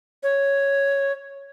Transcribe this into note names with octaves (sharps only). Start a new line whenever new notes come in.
C#5